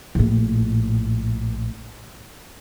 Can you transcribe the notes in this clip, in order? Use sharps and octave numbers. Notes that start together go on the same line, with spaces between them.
A#1 A2